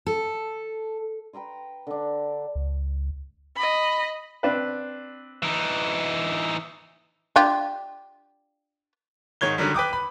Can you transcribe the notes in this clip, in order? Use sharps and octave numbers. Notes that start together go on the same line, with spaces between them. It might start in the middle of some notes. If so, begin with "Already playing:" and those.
A4
B4 G5 A#5 C6
D3 D4
C#2
D#5 B5
C4 D4 B4
E3 D#4
D4 F4 G4
G#2 D#3 C#5 G#6 G7
D3 D#3 F#3 G3
B4 G5 D6 D#6
B5